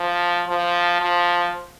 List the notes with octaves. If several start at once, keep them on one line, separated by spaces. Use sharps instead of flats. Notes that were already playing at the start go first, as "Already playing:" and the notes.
Already playing: F3
F3
F3